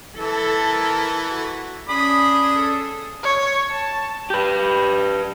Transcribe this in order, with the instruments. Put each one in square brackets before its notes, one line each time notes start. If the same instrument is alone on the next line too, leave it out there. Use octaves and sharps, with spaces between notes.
[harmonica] E3 [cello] A4
[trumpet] A#4
F#4
[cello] C#4 [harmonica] D4 G#4 D#6 [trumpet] B5
[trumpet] A4
[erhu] C#5
A5
[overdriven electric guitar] G4 B4